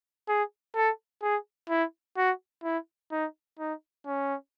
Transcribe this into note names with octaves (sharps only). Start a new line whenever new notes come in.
G#4
A4
G#4
E4
F#4
E4
D#4
D#4
C#4